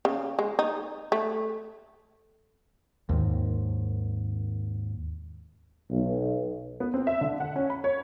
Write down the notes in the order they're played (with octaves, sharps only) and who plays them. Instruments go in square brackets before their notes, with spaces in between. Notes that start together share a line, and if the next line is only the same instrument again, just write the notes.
[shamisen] C#3
G#3
D#4
A3
[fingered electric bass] D#2 G#2 D#3
[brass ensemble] B1
[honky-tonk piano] B3
C4
E5
D3
F#5
C#4
B5
C#5